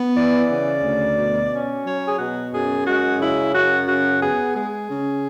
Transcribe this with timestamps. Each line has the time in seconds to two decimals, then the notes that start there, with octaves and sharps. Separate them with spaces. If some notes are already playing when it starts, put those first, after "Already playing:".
Already playing: B3
0.15 E3 D5
0.49 C#3
0.82 D2
1.16 B2
1.50 C#4
1.84 F#3 C#5
2.06 G#4
2.18 B2 F#4
2.52 F#2 G#4
2.85 G#3 F#4
3.19 C#3 E4
3.54 F#2 F#4
3.87 C#3 F#4
4.22 B3 G#4
4.54 G#3 G#4
4.89 C#3